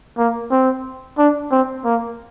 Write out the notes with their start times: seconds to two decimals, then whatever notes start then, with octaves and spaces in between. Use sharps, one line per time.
0.18 A#3
0.51 C4
1.18 D4
1.52 C4
1.85 A#3